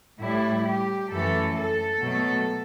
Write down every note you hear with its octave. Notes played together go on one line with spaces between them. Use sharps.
A2 G3 E4
G4
F#2 E3 A3 A4
A4
B2 F#3 A3